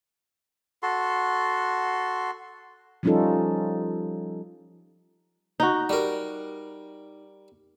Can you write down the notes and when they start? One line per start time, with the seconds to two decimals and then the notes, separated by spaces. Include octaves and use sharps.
0.83 F#4 A4 C6
3.03 F3 G3 C#4 D#4 F4 A4
5.60 D#4 F#4
5.89 G3 A#4